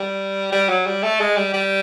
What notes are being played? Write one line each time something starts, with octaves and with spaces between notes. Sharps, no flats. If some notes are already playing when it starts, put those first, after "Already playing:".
Already playing: G3
G3
F#3
G3
A3
G#3
G3
G3